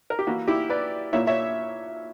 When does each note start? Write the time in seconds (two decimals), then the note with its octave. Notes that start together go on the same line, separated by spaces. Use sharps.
0.10 A#4
0.19 G4
0.27 E3 A#3 E4 F#4
0.48 E4 G4
0.69 B4 D5
1.13 A#2 A#3 E4 C#5 E5
1.27 C#5 E5